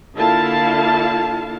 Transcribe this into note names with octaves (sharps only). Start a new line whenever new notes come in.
D3 A#3 E4 F4 F5 A5